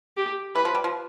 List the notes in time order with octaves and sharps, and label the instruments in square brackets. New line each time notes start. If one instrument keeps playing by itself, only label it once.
[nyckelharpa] G4
[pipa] E3 [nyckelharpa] B4
[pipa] F3
G3
F3